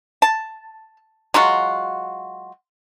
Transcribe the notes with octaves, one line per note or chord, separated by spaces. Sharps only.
A5
F#3 G#3 F4 F#4